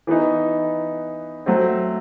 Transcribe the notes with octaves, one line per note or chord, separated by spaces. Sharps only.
E3 B3 D#4
F#3 A3 C4